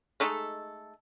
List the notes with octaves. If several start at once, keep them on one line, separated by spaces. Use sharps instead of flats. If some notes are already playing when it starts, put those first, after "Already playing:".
G#3 A3 D#4 A4